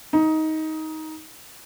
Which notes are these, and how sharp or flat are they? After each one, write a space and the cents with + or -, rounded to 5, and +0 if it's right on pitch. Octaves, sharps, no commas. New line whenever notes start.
D#4 +15